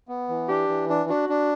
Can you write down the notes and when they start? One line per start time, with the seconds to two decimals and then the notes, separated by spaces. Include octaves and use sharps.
0.08 B3
0.29 E3
0.49 D4 G4
0.69 E3
0.89 D4
1.09 D4 F#4
1.29 D4